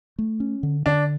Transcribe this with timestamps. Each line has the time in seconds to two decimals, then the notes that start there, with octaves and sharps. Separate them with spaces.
0.19 A3
0.40 C#4
0.63 D3
0.86 D3 D4